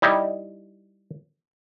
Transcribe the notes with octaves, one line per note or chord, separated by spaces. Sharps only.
G3 D#4 E4